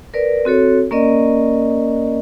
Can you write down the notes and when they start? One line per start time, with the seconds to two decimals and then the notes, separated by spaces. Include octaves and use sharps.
0.14 A#4 B4 D5
0.45 C4 F#4 A4 C#5
0.91 A#3 C#4 A#4 D5 D#5